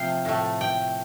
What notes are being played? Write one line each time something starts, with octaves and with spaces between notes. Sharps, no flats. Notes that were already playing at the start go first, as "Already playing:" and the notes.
Already playing: C3 F3 A3 F5 G5
A2 A3
G5